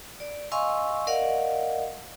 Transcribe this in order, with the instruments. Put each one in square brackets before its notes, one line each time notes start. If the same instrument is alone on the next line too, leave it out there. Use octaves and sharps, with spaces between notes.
[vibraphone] D5
D#5 F5 G#5 C6 C#6 E6
A#4 D5 D#5 F5 F#5